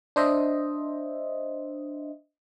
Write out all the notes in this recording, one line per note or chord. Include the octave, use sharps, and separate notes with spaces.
D4 C5 D#5 E5